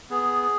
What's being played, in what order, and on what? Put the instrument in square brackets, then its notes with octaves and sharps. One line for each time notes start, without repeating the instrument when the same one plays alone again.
[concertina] B3 G#4